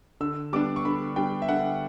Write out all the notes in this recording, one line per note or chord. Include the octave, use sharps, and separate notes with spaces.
D3 E6
G3 B3 D4 D6
C#6
D3 B5
G3 B3 D4 G5
E5
D3 F#5